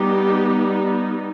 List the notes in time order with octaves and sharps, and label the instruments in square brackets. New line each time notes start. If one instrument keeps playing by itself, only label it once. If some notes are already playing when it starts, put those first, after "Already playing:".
Already playing: [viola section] G3 B3 D#4 G4